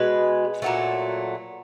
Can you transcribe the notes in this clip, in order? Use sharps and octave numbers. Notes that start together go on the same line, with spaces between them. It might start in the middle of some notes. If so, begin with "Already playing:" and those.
Already playing: B2 G#3 B4
A#2 F#3 A3